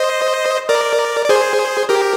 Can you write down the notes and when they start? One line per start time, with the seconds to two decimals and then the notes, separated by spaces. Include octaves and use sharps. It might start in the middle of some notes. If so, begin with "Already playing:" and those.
Already playing: C5 D#5
0.69 A#4 D5
1.25 D5
1.29 G#4 C5
1.89 G4 A#4